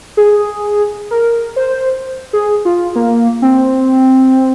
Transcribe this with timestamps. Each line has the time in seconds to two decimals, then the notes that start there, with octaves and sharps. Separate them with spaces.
0.17 G#4
1.11 A#4
1.56 C5
2.33 G#4
2.65 F4
2.95 A#3
3.42 C4